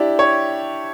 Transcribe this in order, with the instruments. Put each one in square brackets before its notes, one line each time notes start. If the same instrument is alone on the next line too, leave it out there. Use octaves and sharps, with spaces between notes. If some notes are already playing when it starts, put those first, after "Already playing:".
Already playing: [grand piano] D4 E4 G4
C#5